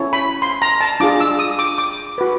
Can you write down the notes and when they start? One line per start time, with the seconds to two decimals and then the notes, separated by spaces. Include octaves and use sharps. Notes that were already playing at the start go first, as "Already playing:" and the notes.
Already playing: C#4 E4 A4 C#5
0.13 B5
0.42 C6
0.62 A#5
0.81 A5
1.00 D4 F4 G#4 D6
1.20 E6
1.39 D#6
1.59 D6
1.78 D6
2.18 F#4 B4